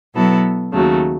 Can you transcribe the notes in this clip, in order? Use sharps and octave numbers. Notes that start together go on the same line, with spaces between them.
B2 F#3 B3 E4 A4
D#2 C#3 F#3 A3